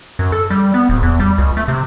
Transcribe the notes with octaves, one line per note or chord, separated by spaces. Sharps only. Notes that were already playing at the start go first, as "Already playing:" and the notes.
F#2
A4
G3
B3
D1
E2
G3
C#2
A3
C3